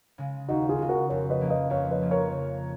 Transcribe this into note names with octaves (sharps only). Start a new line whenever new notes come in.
C#3 G#3
D#2 D#4 F#4
F4 G#4
C#3 G#3
F#4 A#4
F2 A#4 C#5
B4 D#5
F3 A#3 C#4 F4
B4 D#5
F2 C#5 F5
B4 D#5
F3 A#3 C#4 F4
A#4 C#5
C#3